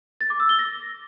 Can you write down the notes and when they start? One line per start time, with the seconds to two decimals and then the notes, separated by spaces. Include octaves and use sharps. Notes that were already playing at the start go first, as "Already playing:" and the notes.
0.21 A6
0.30 D6
0.40 E6
0.49 G7
0.59 A#6